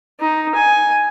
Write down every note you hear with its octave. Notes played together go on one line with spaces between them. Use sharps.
D#4
G#5